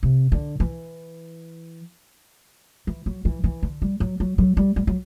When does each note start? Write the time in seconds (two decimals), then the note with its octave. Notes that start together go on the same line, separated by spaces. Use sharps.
0.03 C3
0.32 D3
0.60 E3
2.87 E3
3.06 F#3
3.25 E3
3.44 E3
3.63 D3
3.82 G3
4.00 F#3
4.20 F#3
4.38 F#3
4.57 G3
4.76 G3
4.87 F#3